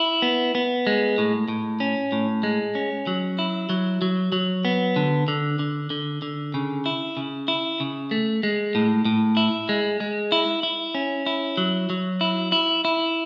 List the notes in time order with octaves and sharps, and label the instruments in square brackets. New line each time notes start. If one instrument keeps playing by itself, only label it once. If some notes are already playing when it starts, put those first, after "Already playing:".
Already playing: [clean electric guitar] E4
B3
B3
G#3
A2
A2
C#4
A2
G#3
C#4
F#3
E4
F#3
F#3
F#3
B3
D3
D3
D3
D3
D3
C#3
E4
C#3
E4
C#3
A3
G#3
A2
A2
E4
G#3
G#3
E4
E4
C#4
E4
F#3
F#3
E4
E4
E4